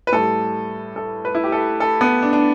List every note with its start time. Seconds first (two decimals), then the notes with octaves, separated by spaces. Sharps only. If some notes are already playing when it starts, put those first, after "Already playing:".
0.07 B4
0.12 A2 G3 A4
0.96 A4
1.25 B4
1.35 E4
1.44 G4
1.52 A4
1.80 A4
2.01 B3
2.22 D4
2.33 D4